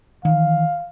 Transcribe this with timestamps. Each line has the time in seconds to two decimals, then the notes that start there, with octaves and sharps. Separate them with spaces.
0.25 D#3 E3 F5